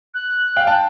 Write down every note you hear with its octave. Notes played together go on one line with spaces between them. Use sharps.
F#6
F5 G5
G5 A5